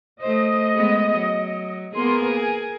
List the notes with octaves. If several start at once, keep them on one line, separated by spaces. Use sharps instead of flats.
A3 C5 D#5
G#3 B3 G#4
F#3
A#3 B3 G#4 A#4 C6
G#5